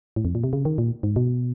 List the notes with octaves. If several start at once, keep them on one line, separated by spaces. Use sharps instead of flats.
A2
F2
A#2
C3
C#3
D#3
A#2
G#2
B2